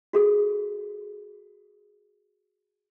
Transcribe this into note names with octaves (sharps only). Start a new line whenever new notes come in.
F#4 G#4 A4